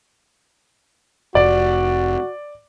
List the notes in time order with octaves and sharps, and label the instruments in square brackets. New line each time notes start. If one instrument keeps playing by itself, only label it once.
[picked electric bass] F1 [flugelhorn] F#4 [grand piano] D5